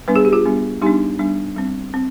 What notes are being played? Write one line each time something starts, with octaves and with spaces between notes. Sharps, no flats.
G3 B3 D4 B4
G#4
G4
F4 G#4
G3 B3 D4
G3 B3 D4 D#4 G4
G3 B3 D4
G3 C4
C4